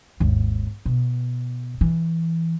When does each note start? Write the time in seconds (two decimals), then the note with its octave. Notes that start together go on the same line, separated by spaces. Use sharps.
0.20 G#1 D#2
0.86 B2
1.81 E3